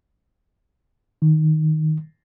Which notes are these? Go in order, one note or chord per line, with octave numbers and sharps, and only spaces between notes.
D#3